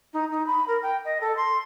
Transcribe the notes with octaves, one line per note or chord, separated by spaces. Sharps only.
D#4
D#4
B5
A#4
G5
D#5
A4
C6